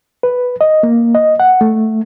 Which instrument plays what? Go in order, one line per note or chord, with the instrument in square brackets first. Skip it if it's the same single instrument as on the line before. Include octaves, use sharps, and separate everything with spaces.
[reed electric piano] B4
D#5
A#3
D#5
F#5
A3